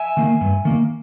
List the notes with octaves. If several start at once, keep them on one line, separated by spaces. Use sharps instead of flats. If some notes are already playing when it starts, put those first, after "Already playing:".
Already playing: E5 G#5
D#3 A#3
G2
D#3 A#3